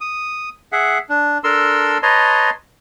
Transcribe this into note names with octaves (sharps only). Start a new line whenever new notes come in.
D#6
G#4 E5 F#5
D4
D4 A4 A#4 C6 E6
B4 C#5 D#5 A5 A#5 C6